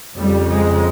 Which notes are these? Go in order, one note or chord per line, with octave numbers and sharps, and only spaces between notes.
F2 C#3 G3
G#3